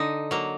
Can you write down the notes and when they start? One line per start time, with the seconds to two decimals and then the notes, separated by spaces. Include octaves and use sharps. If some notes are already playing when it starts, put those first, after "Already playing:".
Already playing: D3 D#4
0.31 F#3 A#3